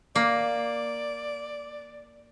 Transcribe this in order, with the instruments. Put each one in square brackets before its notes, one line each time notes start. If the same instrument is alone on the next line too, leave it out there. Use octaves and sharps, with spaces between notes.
[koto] A#3 [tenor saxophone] D5